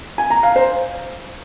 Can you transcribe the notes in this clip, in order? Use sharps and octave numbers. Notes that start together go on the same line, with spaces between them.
G#5
A#5
F5
C5